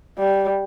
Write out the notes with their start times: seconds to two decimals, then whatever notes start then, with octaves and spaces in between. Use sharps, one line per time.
0.19 G3